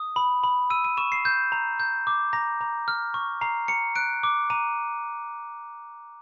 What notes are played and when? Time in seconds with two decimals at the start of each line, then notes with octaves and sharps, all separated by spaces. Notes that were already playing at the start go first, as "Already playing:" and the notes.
Already playing: D#6
0.16 B5
0.44 B5
0.70 E6 D#7
0.85 D#7
0.97 C#6 E7
1.12 C7
1.25 G6
1.52 A#5
1.80 G6
2.07 D6
2.33 A#5 A#6
2.61 A#5
2.88 F6
3.14 C#6
3.41 A#5 C7
3.68 A#5 C#7
3.96 F#6 D7
4.23 D6
4.50 A#5 D#7